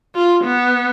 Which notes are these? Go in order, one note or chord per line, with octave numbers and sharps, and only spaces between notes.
F4
B3